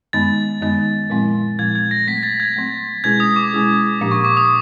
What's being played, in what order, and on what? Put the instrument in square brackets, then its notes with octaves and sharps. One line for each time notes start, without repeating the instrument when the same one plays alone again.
[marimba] F#2 D#3 G#3 B3 D#4 [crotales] A6
[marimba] F#2 D#3 G#3 B3 D#4
A#2 F3 G#3 C4 E4
[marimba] A#2 F3 G#3 C4 E4 [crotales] G#6
[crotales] G#6
A#6
[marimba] F#3 A3 C4 [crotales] B6
[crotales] A6
G#6
[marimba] F#3 A3 C4
[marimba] B2 G#3 C#4 E4 G#4 [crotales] G#6
[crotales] D#6
D6
[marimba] B2 G#3 C#4 E4 G#4
A#2 F3 A#3 D4 G4
[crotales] C#6
D6
D#6